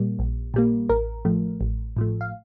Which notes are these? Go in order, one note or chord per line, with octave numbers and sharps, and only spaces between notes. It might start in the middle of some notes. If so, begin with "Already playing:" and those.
Already playing: A#2 G3 A#3
A#1
A#2 G3 A#3
A1 A#4
A2 F3 A3
A1
A2 F3 A3
F5